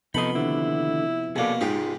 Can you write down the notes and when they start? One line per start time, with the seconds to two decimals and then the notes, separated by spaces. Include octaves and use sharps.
0.14 C3 F3 B3 D#4 A4 D#5 B5 C6
0.35 D#2 D3 E4
1.36 B2 A#3 G#4 A4 D5
1.61 G#2 D#4 F4 G4 G#4